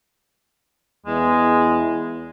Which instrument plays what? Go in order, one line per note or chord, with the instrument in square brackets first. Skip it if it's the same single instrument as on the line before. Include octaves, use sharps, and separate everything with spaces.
[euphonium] E2 [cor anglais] G#3